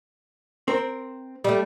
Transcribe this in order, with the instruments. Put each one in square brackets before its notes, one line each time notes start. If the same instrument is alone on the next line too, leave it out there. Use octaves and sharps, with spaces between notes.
[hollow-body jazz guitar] C4 A#4 C5
[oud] G3 A3